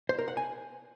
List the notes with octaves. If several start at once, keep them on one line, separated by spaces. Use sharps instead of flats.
C5
A#4
F#5
G#5